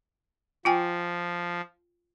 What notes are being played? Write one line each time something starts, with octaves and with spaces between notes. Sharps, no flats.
F3 F4 G5 G#5